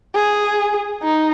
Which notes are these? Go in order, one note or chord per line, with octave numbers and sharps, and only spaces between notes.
G#4
D#4